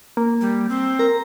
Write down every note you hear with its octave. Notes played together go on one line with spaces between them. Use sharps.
A#3
G3
C4
A#4 A#5